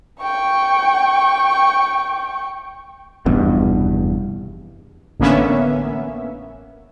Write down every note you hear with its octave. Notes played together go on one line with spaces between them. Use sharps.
G5 C#6
F1 E2 G2 B2
A1 D3 A#3 B3 C#4 E5